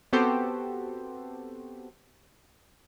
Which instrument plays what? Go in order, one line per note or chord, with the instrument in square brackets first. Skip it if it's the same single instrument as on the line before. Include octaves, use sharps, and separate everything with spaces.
[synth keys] B3 C4 F#4 G4 A4 C5